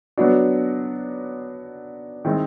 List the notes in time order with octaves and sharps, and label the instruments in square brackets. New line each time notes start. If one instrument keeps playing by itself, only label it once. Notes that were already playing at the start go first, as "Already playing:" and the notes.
[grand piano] F#3 B3 D4 F#4
D#3 G#3 C4 E4